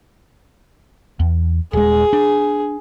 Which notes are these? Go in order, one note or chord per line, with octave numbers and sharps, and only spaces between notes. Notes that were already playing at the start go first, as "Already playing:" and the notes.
E2
D#1 G#3 G#4
D4